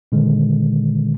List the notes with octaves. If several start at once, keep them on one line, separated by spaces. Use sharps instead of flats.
A#2 D3 D#3 G#3